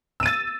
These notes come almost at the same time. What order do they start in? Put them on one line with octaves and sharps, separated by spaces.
E6 D#7 A6